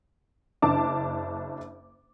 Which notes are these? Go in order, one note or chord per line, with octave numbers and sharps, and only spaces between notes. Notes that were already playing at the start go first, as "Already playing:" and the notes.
F#1 D4 A5 D6